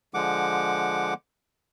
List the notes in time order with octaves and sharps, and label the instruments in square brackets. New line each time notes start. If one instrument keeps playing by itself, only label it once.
[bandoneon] D3 F3 G#3 F#5 D6